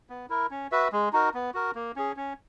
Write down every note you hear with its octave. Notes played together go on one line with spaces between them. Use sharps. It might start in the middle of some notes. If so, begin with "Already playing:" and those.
B3
E4 A#4
C#4
F#4 B4 E5
G#3
D#4 F#4 A#4
B3
F#4 A#4
A#3
C#4 G#4
C#4